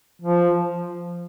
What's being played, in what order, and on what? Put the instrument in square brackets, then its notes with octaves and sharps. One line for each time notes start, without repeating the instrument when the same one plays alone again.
[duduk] F3